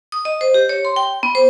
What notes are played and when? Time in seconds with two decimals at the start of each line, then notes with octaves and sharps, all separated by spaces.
0.12 D#6
0.25 D#5
0.41 C5
0.54 G4
0.69 C#5
0.85 C6
0.96 G5
1.23 B3
1.35 C5